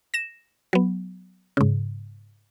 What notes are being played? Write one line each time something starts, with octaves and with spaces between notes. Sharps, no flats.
A#6 E7
F#3 B3
G#2 C#3